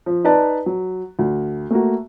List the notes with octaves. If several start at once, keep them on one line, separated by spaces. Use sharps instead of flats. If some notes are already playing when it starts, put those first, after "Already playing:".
F3
D#4 B4 D5 A5
F#3
D2
A3 A#3 F#4